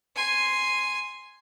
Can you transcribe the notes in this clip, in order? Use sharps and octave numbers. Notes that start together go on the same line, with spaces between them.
G#5 C6